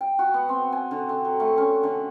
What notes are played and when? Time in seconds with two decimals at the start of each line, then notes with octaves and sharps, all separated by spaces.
0.01 G5
0.19 F#4
0.34 B3
0.49 C4
0.72 G#5
0.91 D3
1.09 D3
1.25 F#3
1.40 A3
1.57 C#4
1.83 D3